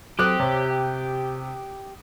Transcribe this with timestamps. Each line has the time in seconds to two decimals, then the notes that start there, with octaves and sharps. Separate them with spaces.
0.19 F#3 C4 F#4 G4 A4 D6 D#6 F#6
0.40 C3 C5 C#5
0.71 G5